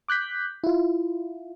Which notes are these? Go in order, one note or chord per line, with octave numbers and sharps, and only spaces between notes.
D6 F#6 G6 B6
E4 F4